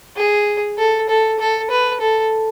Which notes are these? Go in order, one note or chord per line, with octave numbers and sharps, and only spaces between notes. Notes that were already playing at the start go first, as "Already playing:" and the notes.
G#4
A4
A4
A4
B4
A4